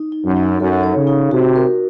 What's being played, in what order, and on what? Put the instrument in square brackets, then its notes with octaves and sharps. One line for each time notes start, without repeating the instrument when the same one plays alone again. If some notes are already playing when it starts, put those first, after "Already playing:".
Already playing: [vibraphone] D#4
D#4
[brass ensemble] F#2
[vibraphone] D#4
[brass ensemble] F#2 [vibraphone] A4
[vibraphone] C#5
[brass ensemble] C#3
[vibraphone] D#4
[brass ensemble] C3 [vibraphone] F#4
[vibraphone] A#4